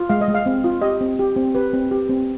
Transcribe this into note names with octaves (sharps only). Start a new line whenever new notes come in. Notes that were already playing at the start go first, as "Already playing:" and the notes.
Already playing: F4
G#3 F5
D#5
G#3
F5
C4
F4
G4 D#5
C4
G4
C4
G4 B4
C4
G4
C4